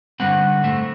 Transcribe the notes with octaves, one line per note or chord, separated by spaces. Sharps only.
G2 D3 G3 C4 F#5
A2 A3 C4